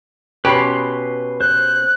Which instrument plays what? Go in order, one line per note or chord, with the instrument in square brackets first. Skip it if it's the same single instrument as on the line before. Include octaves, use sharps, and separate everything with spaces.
[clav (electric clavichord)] B2 C#4 G4 [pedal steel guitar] B4 B5 C6
[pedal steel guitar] C5 [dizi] F#6